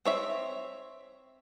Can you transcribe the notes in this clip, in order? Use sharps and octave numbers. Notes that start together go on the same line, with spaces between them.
C4 C#5 E5